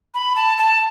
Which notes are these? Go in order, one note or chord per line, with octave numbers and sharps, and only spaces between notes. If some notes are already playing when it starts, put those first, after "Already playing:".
B5
A5
A5